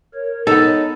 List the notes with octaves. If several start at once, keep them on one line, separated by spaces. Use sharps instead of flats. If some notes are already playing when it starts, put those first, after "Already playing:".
A#4 C#5
B3 D#4 A4